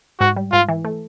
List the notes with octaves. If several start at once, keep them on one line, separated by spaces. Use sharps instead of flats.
G#2 F#4
G3
G#2 F4
E3
A3